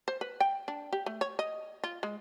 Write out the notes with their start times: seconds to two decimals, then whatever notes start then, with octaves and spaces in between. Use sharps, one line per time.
0.08 C5
0.21 B4
0.40 G5
0.68 D4
0.93 G4
1.06 A3
1.21 C#5
1.39 D#5
1.84 F4
2.03 G#3